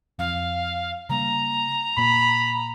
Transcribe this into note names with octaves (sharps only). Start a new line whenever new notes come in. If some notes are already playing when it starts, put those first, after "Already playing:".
F2 F5
C#3 G3 A#3 A#5
A#2 A#3 B5